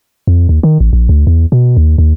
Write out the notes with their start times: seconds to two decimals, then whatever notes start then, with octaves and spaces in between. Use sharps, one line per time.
0.27 F2
0.49 D#2
0.63 D#3
0.80 A1
0.93 A#1
1.09 D2
1.27 E2
1.52 B2
1.77 D#2
1.98 D#2